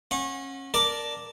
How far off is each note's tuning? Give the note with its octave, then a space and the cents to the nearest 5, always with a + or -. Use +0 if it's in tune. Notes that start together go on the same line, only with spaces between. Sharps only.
C#4 -30 F#5 -25
A#4 +0 D5 +0 A5 +0